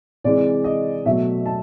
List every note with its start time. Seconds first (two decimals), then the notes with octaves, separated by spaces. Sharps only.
0.24 C3 E3 G#3 D5
0.64 D#5
1.05 B2 F#3 A3 E5
1.46 A5